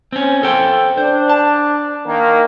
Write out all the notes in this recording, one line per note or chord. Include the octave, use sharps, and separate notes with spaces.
C4 C#4
A4 C5 G5
D4 C5
A5
D#3 A#3